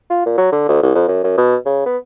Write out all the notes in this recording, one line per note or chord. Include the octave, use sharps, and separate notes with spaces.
F4
A#2
F#3
D3
D2
C2
F2
F#2
F#2
B2
C#3
B3